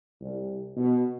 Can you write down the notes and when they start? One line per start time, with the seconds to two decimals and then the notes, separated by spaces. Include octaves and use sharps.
0.21 C2
0.76 B2